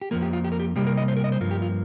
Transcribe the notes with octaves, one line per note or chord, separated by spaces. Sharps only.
G4
F2 F3 A#3 A#4
G4
F4
G4
A#4
G4
C3 G3 A#3 G4
A#4
D#5
C5
A#4
D#5
C5
G2 F3 A#3
G4
F4